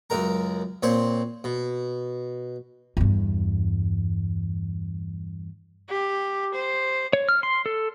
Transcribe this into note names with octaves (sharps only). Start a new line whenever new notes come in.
C#2 F#2 A#4 A#5
A#2 C4 C5 C#5
B2
E2 G2
G4
C5
C#5
F6
C6
A4